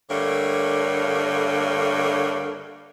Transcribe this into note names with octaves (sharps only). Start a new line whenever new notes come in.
G2 D3 A3 A#3 C#5